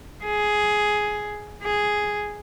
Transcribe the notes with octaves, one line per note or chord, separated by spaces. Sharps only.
G#4
G#4